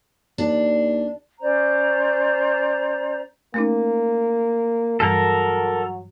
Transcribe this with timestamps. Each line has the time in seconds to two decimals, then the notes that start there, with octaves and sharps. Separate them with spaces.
0.38 D#2 D4
1.41 C#4 C5 D5 A#5
3.54 A3 A#3 C#4 D#4
5.00 G2 E3 F#3 G3 A4 A#4